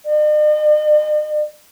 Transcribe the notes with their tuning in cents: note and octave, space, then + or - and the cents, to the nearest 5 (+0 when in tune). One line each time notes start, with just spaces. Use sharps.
D#5 -45